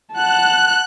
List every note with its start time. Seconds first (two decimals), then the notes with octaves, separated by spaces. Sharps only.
0.13 F#5 A5 F#6